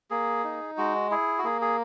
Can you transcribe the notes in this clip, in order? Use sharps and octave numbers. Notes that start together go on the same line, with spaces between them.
A#3 G#4
D#4
G#3 F#4
E4 G#4
F#4
A#3 G#4
G#4